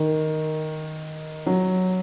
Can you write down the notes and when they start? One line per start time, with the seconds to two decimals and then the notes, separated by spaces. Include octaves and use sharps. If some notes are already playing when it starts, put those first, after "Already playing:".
Already playing: D#3
1.46 F#3